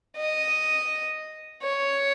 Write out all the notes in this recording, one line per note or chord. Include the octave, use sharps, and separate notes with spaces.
D#5
C#5